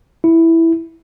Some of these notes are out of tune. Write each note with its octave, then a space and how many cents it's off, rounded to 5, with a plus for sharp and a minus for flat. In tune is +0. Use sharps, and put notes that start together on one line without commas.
E4 +0